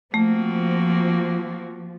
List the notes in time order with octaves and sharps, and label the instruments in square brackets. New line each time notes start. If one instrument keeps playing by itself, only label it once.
[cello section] F3 [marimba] A3 [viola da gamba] A#3 C4 F#4